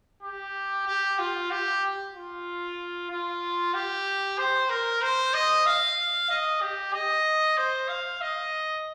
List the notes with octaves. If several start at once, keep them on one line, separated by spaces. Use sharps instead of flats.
G4
G4
F4
G4
F4
F4
G4
C5
A#4
C5
D#5
F5
D#5
G4
D#5
C5
F5
D#5